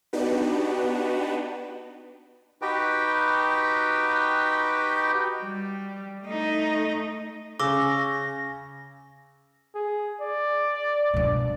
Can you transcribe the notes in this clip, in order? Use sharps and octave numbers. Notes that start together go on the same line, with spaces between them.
B3 D4 D#4 F#4 G4 B4
D#4 F#4 G4 B4 G5
G3
A3 D#4
C#3 C#4 D6 E6 A#6
G#4
D5
G2 B2